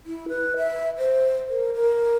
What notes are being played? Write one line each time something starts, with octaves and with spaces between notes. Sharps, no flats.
E4
B4
E5
C5
A#4
A#4